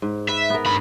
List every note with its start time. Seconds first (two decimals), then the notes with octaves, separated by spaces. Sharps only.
0.02 G#2
0.28 B4 E5
0.50 B3 A#4
0.66 G2 B5